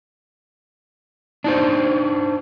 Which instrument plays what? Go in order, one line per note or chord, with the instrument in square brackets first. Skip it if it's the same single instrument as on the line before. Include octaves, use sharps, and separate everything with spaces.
[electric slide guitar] D4 D#4 C5